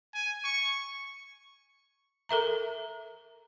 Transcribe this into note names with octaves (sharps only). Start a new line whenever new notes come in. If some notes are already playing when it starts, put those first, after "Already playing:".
G#5
C#6
A4 A#4 E5 A#5